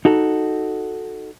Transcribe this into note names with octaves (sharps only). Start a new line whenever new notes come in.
D#4 F#4 A4